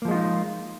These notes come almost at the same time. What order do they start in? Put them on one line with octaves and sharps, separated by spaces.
A#3 F3 G#3 F4 D#4